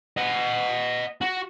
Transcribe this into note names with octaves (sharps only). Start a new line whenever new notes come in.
D#5 F#5
F#4